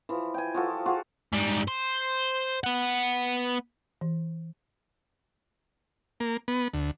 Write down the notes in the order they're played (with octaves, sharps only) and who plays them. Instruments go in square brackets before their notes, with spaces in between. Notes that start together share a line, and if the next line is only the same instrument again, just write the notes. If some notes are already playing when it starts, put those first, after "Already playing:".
[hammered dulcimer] E3 F3
G5 G#5
F3 F#4 A4
F4 F#4 G#4
[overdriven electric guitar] G#2 G3
C5
B3 F#5
[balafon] E3
[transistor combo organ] A#3
B3
D2